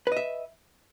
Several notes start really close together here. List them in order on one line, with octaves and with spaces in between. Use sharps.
B4 D#5 E5